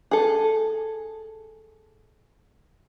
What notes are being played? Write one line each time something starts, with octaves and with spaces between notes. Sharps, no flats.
G#4 A4